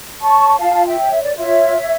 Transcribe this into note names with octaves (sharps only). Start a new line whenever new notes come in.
C#5 A5 C#6
F4 F5 A5
A5
E5 G5
C#5
E5
D5
F4 C#5 E5
C#5